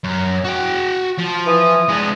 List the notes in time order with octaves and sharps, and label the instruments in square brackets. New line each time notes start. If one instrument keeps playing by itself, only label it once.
[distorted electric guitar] F#2
F#4 G5
F3
[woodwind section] E3 D#6
[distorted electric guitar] G#3 D4